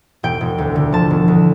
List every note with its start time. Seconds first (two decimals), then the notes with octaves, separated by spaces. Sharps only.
0.23 E1 G5
0.41 E1
0.58 D2
0.76 D3
0.92 F3 A5
1.10 E1
1.28 D2